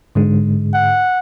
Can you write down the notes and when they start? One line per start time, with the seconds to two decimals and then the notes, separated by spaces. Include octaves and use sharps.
0.15 G#2 D3 G#3
0.74 F#5